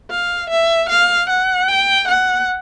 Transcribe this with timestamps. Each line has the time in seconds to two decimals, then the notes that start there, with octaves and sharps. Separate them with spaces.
0.11 F5
0.50 E5
0.89 F5
1.29 F#5
1.68 G5
2.08 F#5